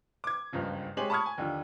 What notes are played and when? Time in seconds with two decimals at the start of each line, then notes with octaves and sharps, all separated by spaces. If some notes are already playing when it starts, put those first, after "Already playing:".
0.24 D6 G#6
0.52 F#1 C#2 G2 C#3 F3
0.97 G#3 C4 G4 C#5 G#5 F#7
1.10 A5 B5 C#6 D#6 F6 G#6
1.26 G#5
1.38 D#2 D3 F3